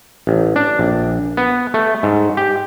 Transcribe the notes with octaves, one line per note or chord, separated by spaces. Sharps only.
A1
D4
A#1
B3
A3
G#2
G4